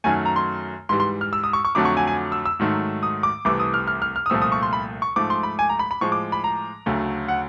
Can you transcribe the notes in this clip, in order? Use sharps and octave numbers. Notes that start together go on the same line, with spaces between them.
F#2 D#3 F#3 A3 G#5
A#5
C6
G#2 E3 G3 C6
C6
F6
E6
D#6
C#6
C#6
F2 D3 F#3 A3 D6
C#6
G#5
G#5
E6
E6
G#2 D#3 F#3 A3
D#6
D6
C2 C3 E3 A3 D6
D#6
F6
F6
F6
F6
D#6
C2 A#2 F3 A3 E6
D#6
C#6
C6
B5
C#6
G#2 F3 A3 D6
C6
B5
G#5
A#5
B5
B5
A2 F3 G#3 C#6
D6
B5
A#5
D2 C#3 F#3 A3
F#5